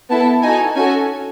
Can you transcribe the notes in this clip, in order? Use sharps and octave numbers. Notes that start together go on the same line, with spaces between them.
B3 E4 A4 A5
D#4 F#4 A4 G#5
C#4 F#4 A4 G#5